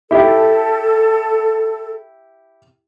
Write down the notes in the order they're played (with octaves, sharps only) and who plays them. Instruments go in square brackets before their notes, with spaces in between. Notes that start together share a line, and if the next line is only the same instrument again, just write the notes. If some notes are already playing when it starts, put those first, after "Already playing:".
[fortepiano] E4 G4 [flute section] A4